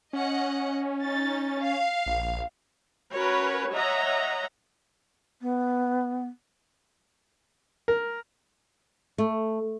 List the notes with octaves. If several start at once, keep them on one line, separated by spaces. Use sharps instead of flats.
C#4 D#5 F#5
D#4 A6
F5
A#1
C#4 F#4 A#4 B4 C#5
C#5 D#5 E5 F#5 A#5
B3
A#4
A3